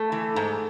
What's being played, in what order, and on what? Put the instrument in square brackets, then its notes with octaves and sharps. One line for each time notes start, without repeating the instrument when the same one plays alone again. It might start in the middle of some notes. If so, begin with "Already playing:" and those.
Already playing: [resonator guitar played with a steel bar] A3
E3
G#2